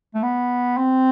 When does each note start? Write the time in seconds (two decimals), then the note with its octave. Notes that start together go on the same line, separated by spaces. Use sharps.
0.14 A3
0.23 B3
0.77 C4